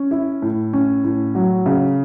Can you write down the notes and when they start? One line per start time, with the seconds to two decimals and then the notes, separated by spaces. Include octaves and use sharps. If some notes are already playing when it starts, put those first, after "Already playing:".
Already playing: C#4
0.11 E4
0.42 A2
0.73 C#4
1.04 A2
1.35 F#3
1.66 C#3